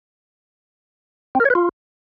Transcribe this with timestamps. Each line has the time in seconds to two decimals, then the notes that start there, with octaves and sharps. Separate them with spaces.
1.35 C4
1.40 A#4
1.45 C#5
1.50 B4
1.55 F4